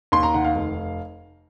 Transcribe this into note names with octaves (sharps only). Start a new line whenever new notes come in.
D#2 C6
A#5
D#3 F#5
F5
F1